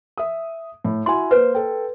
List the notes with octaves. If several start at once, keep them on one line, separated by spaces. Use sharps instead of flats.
E5 D#6
A2
E4 F#4 G#5 C6
A#3 B4 C5
A4 G5